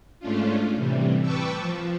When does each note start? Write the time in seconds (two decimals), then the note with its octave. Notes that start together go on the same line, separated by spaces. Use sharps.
0.20 G#2 A3 C#4 D4 F4
0.75 A2 C3 E3 G3
1.21 B4 G5 A5 C#6 D6 E6
1.59 F3